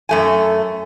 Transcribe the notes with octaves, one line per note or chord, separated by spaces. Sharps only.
F#2 A3 G#5